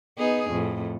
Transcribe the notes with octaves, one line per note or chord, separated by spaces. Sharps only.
B3 D#4 G#4
F2 A2